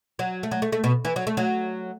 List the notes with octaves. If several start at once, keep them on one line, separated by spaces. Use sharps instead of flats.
F#3
A3
F#3
A3
A3
B2
E3
F#3
A3
F#3